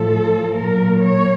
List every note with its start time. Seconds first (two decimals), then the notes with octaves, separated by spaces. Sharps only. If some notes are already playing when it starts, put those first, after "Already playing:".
Already playing: A2 F3 A4
0.58 A#2 F#3 A#4
1.02 C#5